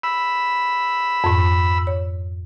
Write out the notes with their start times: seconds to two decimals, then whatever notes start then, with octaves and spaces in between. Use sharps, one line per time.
0.03 B5 E6
1.24 F2 G#2
1.87 C#5